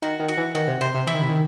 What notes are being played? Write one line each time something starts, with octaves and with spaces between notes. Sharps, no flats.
D#3 F#4
D#3
F#4
E3
D#3 F#4
C3
C3 C5
C3
E3 E4
D#3
C3
D#3